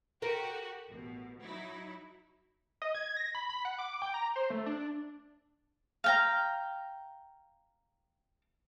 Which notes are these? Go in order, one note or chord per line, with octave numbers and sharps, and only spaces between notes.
F#4 G4 A#4
A1 B2
F#3 D#4 E4
D#5
G#6
A#6
B5
B5
F#5
D6
G5
A#5
C5
A3
D4
F5 G5 A#5